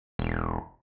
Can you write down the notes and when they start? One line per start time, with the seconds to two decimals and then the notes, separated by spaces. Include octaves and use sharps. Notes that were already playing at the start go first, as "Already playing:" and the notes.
0.19 E1